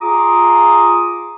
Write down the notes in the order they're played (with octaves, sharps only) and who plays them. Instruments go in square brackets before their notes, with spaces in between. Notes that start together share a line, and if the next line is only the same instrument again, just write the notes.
[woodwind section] F4 G#4 A#5 D6 D#6